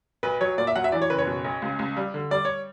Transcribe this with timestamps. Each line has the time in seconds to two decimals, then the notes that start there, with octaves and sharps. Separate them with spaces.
0.23 B1 B4
0.41 F#3 C#5
0.58 A#2 D5
0.67 E5
0.76 F#3 F#5
0.84 E5
0.92 E3 D5
1.02 C#5
1.10 F#1 B4
1.18 C#5
1.27 B2
1.45 B1
1.62 C#2
1.79 C#2
1.97 G3
2.14 D3
2.31 G3 D5
2.45 C#5